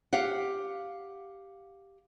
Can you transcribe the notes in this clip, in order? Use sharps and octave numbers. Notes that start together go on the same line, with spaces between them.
G4 F5 F#5